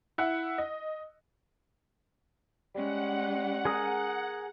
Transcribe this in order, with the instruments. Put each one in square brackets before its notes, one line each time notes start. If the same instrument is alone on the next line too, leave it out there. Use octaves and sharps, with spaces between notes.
[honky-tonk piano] E4 F#5
D#5
[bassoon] G3 [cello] G#3 C#4 [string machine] F#5
[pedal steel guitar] G#4 A#4 D#6